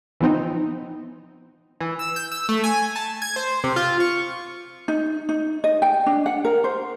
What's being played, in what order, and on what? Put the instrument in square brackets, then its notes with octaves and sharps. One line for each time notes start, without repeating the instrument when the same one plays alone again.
[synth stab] E3 F3 B3 C4 D#4
[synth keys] E3
E6
G6
E6
A3
G#5
A5
G#6
C5
C3
F4
C#6
[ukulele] D#4
D#4
D#5
G5
D4
F#5
A#4
C5